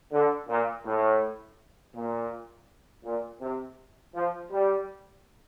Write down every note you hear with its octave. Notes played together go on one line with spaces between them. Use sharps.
D3
A#2
A2
A#2
A#2
C3
F3
G3